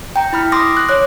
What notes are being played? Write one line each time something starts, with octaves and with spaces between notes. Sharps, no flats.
G5 A#5
E4 B5 F6
C6 D6 D#6 A#6
F#6
C#5 D6 F#6